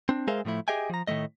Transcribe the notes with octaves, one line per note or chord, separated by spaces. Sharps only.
C4 D4
G#3 G#4 A#4 C5 E5 F5
A2 F3 A3 E4
G4 G#4 D#5 E5 G5 G#5
F3 A#5
A2 D#3 F3 A3 D#5